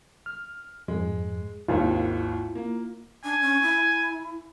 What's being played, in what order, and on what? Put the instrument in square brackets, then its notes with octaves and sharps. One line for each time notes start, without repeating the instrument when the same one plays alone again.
[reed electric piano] F6
[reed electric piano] F2 G#2 [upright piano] G#3
[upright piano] G#1 D#2 G#2 [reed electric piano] E4 F4
[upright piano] A#3
[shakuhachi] D4 [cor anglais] G#5
[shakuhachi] C#4
E4